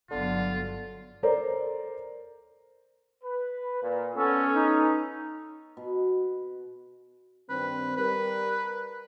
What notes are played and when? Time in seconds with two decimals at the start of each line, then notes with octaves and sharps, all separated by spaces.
0.11 G1 D3 F#3 B3 F4
1.23 A4 A#4 C5 D5 A#5
3.22 B4
3.81 A#2
4.14 B3 C#4 A4
4.54 D#4
5.77 B2
7.49 G2 D#3 C4 B4
7.97 G3 A#4 B4